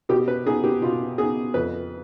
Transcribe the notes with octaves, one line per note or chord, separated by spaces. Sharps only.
B2 G4
B4
B3 D#4 G#4
G4
B2 F4
B3 D#4 G#4
F2 B4